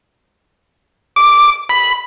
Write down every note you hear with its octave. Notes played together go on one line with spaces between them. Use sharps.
D6
B5